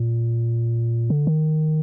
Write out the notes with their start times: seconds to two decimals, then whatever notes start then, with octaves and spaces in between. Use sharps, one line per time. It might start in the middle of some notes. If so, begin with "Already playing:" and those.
Already playing: A#2
1.10 D3
1.27 D#3